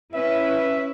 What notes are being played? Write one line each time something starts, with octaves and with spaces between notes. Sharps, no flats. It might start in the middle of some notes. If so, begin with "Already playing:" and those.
C#4 E4 B4 E5